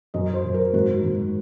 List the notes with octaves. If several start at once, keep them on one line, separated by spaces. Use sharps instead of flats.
F#2 D#5
C5
F#2
A#4
G#2 F#4
G#2